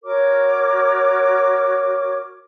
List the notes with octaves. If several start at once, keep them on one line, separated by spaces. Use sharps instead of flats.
F#4 A#4 C#5 D6